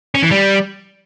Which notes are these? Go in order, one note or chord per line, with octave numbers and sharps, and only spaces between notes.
C#4
E3
G3